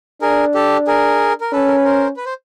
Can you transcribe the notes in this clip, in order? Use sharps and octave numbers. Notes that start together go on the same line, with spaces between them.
D4 G#4 A#4
G4 A4
G#4 A#4
A#4
C#4 A4 B4
A#4
B4
A#4 C5
B4
C5